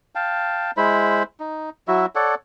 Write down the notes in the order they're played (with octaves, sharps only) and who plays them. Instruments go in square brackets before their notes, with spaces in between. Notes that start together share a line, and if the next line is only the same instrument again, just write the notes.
[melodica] F5 G5 A5
G#3 E4 C5 B5
D#4
F#3 E4 F#4 E5
A4 C#5 D5 F#5